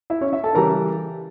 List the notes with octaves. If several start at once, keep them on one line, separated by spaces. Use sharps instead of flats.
E4 E5
C#4 C#5
E4 E5
A4 A5
C#3 E3 G3 A#4 A#5